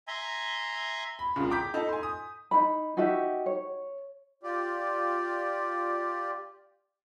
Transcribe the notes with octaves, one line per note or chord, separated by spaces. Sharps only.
E5 G#5 A#5 C6
B5
E1 C2 A#2 C#3
G5 A#5 D6 G6 B6
D#4 A4 A5
G#5 C6
D#6
D#4 B5
D#4 F#4 G4 E5
C#5
F4 G4 D5